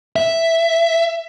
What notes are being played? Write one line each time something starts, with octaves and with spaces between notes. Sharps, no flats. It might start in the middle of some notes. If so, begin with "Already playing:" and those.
E5